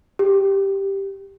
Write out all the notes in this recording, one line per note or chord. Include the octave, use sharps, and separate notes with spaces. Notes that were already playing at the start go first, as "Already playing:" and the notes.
G4